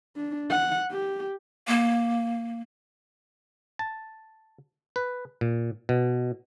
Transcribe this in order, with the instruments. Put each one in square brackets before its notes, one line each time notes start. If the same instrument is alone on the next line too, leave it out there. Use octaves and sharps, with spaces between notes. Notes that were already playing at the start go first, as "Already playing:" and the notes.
[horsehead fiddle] D4
F#5
G4
[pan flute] A#3
[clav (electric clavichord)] A5
B4
A#2
B2